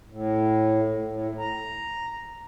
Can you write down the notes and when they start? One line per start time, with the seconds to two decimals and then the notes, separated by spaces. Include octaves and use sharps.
0.10 A2
1.04 A2
1.39 A#5